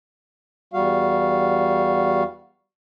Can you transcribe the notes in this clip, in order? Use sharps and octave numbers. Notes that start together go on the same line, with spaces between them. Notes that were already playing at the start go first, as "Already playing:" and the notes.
E2 G3 F#4 F5